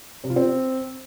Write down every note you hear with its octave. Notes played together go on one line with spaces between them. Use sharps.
C3
F4
C4